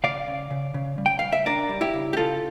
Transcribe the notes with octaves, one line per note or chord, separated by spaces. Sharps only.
C#3 D5 F5
C#3
C#3
C#3
G3
G5
C#3 F5
E5
D4 A#4 D5
G3
E4 G4
C#3
G4
C#3 F4 A4